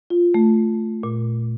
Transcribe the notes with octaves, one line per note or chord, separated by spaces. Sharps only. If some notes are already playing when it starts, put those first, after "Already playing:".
F4
A3
A#2